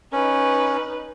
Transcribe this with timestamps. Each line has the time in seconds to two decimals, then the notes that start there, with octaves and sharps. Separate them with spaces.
0.13 C#4 D#4 B4